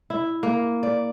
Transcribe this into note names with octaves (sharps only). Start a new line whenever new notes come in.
E4
A#3
D5